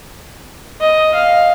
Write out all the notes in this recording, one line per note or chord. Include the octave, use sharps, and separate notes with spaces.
D#5
F5